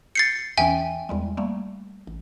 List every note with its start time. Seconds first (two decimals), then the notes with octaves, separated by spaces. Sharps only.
0.15 G6 A6 C7 C#7
0.57 E2 E3 C#4 E5 G5 G#5
1.09 E2 G3 G#3
1.37 G3 A3 A#3
2.07 A1